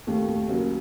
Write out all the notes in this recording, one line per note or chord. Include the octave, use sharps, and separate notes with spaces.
D#2 A3
A3
C#3 F#3 A#3